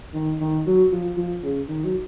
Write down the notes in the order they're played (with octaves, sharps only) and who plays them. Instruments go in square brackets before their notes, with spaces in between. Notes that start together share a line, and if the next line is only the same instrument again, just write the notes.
[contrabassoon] D#3
D#3
F#3
F3
F3
C#3
D#3
F#3